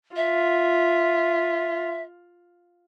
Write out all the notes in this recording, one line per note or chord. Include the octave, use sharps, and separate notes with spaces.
F4 E5